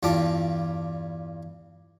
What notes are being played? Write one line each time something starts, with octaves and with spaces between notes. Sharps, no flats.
E2 G2 G3 F4 A5 D6